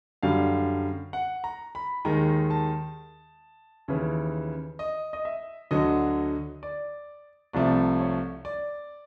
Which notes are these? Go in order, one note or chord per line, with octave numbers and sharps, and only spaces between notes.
F#2 D3 G3 F5
F#5
A#5
B5
D#2 D#3 G#3 A#5
A5
D#2 C#3 E3
D#5
D#5
E5
D2 D3 F#3 D#5
D5
C2 C3 F3 A3 D5
C#5
D5